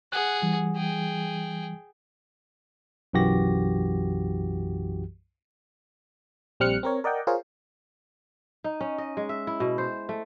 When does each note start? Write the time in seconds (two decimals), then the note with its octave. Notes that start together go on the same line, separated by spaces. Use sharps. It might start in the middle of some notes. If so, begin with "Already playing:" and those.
0.12 G#4 F#5 F#6
0.42 E3 G3
0.76 G#4 G5
3.13 B1 F#2 E3 F#4 G4 A#6
6.60 A#1 G3 C4 F6 F#6 C#7
6.83 C4 A#4 C#5
7.04 A#4 D5 D#5 F#5 G5
7.27 F4 G#4 A#4 C5 C#5
8.64 D#4
8.81 C#4
8.98 D#5
9.17 G#3
9.29 E5
9.47 E4
9.60 B2
9.78 C5
10.09 A3